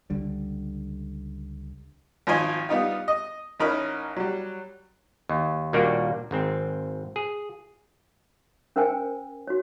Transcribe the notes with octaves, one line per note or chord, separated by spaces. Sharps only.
C#2 D3 G3
G#1 F3 D#4 C5 G#5 C6
G3 B3 D#4 F4
D#5
A1 C#4 D#4 A#4 B5
F#3 G3
D#2
D#2 A#2 G3 A#3 D4 F#4
G#1 G#2 C4
G#4
C#4 A#4 C5 G5 G#5
F#4 C#5